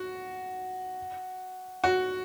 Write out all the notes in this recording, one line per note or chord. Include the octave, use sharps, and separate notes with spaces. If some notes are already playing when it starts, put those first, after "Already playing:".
Already playing: F#4
F#4